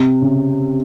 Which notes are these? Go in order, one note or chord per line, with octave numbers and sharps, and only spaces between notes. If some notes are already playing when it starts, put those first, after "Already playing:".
Already playing: C3
C#3